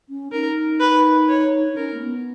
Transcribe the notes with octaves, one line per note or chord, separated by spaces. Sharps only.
C#4
D#4 A#4
B4
C#5
D#4
C#4 A#4
A#3
B3